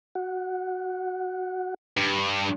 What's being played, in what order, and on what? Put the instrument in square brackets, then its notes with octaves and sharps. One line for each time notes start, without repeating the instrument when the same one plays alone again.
[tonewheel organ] F#4 F#5
[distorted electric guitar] G2